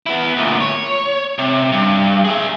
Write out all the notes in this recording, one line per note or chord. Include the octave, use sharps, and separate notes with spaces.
B3 E4
D2 A#2
C#5
C3
G2
G#4 E5